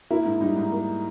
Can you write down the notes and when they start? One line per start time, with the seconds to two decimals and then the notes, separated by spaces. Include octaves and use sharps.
0.11 A#3 E4
0.25 G#2
0.41 G3 D#4
0.57 G#2
0.72 A#3